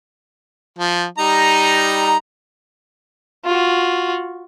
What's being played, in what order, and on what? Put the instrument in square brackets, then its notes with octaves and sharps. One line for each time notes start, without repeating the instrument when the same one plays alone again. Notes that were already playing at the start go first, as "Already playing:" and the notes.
[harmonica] F3
G3 D#4 A#5
[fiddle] F4 F#4